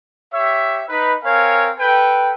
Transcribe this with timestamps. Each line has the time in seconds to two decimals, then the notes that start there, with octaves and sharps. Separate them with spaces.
0.34 G4 C#5 E5
0.89 D#4 B4
1.25 C4 A#4 C#5 F5 G#5
1.80 A4 B4 G5